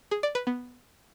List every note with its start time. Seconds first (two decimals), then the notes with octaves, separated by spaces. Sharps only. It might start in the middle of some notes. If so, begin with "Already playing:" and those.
0.11 G#4
0.23 D5
0.35 B4
0.47 B3